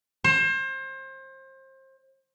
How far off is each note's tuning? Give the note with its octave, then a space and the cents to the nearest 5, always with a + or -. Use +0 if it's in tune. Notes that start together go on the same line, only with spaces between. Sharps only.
C5 +30